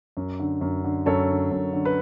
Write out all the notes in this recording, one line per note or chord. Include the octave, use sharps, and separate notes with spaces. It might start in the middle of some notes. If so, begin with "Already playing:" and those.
F#2
D3
F#2
D3
F#2 A4 C#5
D3
F#2
D3
B4